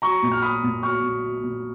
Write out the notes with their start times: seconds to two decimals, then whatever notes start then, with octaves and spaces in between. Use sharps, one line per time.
0.02 F#3 A#5 C#6
0.23 A#2
0.32 F6
0.42 F#3 B5 D#6
0.63 A#2
0.83 F#3 C#6 F6
1.03 A#2
1.23 F#3
1.43 A#2